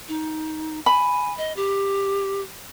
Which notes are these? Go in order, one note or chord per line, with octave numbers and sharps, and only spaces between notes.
D#4
G#5 B5
D#5
G4